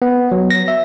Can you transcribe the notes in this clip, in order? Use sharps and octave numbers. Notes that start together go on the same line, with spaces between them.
B3
F#3
A#6
E5